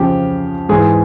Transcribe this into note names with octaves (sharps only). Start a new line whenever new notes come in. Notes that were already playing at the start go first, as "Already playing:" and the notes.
Already playing: F2 C#3 F3 G4
G#2 E3 G#4